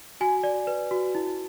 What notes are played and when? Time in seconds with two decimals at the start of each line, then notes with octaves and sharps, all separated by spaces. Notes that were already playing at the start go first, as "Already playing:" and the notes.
0.21 F#4 G#5
0.43 D5
0.67 B4
0.91 F#4
1.15 E4